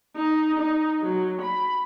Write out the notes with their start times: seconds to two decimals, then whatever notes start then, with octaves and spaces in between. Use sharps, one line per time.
0.16 D#4
0.59 D#4
1.00 F#3
1.41 B5